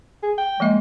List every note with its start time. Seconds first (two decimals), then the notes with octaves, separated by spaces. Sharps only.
0.23 G#4
0.38 G5
0.60 F3 G#3 A#3 E5